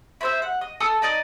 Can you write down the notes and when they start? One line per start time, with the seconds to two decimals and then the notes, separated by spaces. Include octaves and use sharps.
0.21 E4 C5 E5
0.42 F#5
0.61 D#5
0.80 A4 A5 D#6 E6
1.02 D#4 D5 D#5